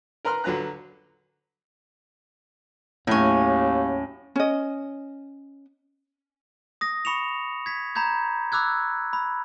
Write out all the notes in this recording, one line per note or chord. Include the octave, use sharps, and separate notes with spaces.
A#4 B4 A#5 C6 F6
D3 F#3 B4 A#5 F#6
D#2 A2 F#3 C#4
C#4 D#5
D#6 A#6
B5 C#6 C#7 E7 F7
G#6 B6
A#5 B5 G6 G#6
B5 D6 E6 F#6 G#6
B5